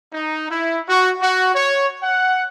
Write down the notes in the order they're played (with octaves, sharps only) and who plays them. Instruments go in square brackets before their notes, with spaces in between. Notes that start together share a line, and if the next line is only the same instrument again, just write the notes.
[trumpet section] D#4
E4
F#4
F#4
C#5
F#5